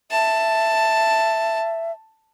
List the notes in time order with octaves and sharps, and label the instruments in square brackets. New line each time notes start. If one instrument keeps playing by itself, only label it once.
[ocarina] E5 [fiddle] A5